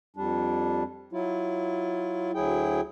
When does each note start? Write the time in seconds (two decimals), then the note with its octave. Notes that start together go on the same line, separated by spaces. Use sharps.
0.16 F2 G3 D4
1.13 F#3 E4 F4
2.35 D2 F#3 E4 G#4 G5